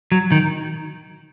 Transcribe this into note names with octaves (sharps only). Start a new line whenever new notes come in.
F#3
D#3